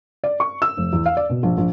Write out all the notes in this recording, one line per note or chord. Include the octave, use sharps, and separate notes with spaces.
D5
C#6
E6
F1
E2
F5
D5
B2
A#1
A#1